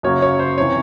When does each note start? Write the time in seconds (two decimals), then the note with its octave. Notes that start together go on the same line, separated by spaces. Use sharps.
0.03 F#2 C#3 F#3 A#3 C#5
0.22 C#5
0.39 C5
0.58 C3 E3 C#5